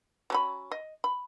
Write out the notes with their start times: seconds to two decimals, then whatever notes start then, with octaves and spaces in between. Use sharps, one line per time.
0.30 F#3 C#4 B5
0.71 D#5
1.04 B5